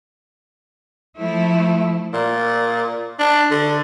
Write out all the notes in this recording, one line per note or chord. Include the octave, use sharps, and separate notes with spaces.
F3 A3 E4
A#2
D4
D3